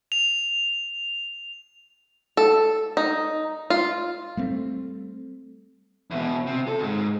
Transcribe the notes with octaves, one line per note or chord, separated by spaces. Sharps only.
F7
A4
D#4
F4
G3 A3 C4
E2 B2
C3
A4
C2 G#2